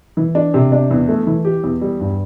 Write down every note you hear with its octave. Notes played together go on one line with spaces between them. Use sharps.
E3
D4
C3
D4
E2
A3
E3
G4
E2
G3
G2